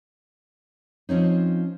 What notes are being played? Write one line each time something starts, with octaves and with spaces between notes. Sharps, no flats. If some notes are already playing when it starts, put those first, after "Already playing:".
F3 C4 C#4 D#4